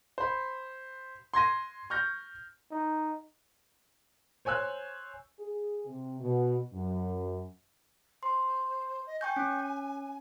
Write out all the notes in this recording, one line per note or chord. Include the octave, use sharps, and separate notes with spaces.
C5 B5
C6 G#6 A#6 D#7
C#6 F6 G6 A#6
D#4
C5 C#5 G#5 E6 F#6
G#4
C3
B2
F#2
C5 C6
D#5
G5 G#5 C#6 G6
C#4